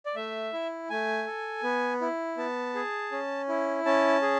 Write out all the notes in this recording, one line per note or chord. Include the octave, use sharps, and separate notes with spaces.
D5
A3 E5
E4
A3 G#5
A4
B3
E4
B3 A5
G#4
C#4
E4
C#4 A5
G#4